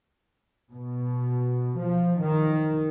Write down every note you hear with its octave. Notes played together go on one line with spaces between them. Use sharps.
B2
F3
D#3